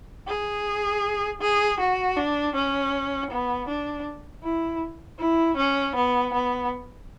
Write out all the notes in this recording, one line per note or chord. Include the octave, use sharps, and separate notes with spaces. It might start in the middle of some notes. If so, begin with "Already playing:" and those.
G#4
G#4
F#4
D4
C#4
B3
D4
E4
E4
C#4
B3
B3